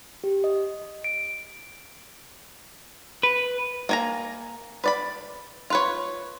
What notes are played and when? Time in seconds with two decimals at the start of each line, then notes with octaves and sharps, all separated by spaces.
0.24 G4
0.44 D#5
1.04 D7
3.23 B4
3.89 A#3 G#5 A#5
4.84 B4 D5 B5
5.70 F4 B4 C#5